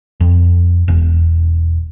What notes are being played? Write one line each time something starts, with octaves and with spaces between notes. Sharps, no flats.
F2
E1